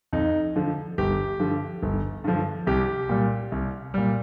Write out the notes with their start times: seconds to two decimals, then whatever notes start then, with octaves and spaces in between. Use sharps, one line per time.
0.13 F2 D#4
0.56 D3 F3
0.98 G1 G4
1.40 G2 D3 F3
1.83 G1
2.24 G2 D3 F3
2.67 C2 G4
3.09 A#2 G3
3.52 C2
3.94 A#2 G3